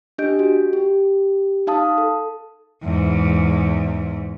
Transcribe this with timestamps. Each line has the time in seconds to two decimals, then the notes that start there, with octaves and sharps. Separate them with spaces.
0.18 D4 G4 D#5 G6 D7
0.39 F#4
0.73 G4
1.67 D#4 F5 A5 D#6
1.98 A4
2.83 E2 G#2